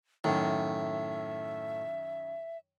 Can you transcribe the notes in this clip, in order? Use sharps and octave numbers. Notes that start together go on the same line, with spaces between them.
F#2 A2 D#3 E5